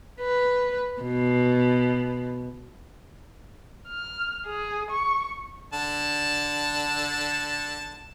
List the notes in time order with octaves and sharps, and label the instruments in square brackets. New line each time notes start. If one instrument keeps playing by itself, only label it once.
[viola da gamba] B4
B2
[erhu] F6
G#4
C#6
[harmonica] D3 A5